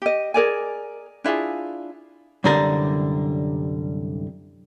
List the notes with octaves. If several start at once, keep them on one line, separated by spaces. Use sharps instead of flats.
G4 D#5
G#4 A#4 D5 G#5
D4 E4 F4 G#4
C2 F#2 D3 G3 A#4 D5